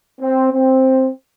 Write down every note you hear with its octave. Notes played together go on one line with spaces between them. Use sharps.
C4
C4